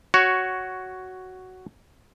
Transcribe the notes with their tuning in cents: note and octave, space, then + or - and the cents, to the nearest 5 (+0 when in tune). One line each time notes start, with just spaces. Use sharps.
F#4 +5 C#5 +0